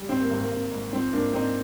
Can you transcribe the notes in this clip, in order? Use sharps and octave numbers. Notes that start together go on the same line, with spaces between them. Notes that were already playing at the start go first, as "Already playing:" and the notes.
Already playing: G3
G#1 C4
A#3
G#1
A#3
G#1
G#2
F3 C4
G#2 A#3 D4
G#2 C4 D#4